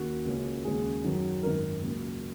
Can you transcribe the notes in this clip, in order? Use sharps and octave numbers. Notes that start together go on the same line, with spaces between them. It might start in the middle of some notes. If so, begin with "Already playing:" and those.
Already playing: D#2 D#3 A#3 C#4 F#4
C#2 C#3 A#3 C#4
D#2 C#3 G#3 C#4 G#4
F#2 D#3 F#3 C#4
G#1 F#2 D#3 A#4
C#2 C#3 F#3 A#3